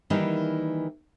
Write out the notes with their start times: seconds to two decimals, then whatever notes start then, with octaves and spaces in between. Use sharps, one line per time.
0.10 D#3 E3 G3 A#3 D#4